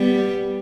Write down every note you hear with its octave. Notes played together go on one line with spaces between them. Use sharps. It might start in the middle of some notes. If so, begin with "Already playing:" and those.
Already playing: G3 B3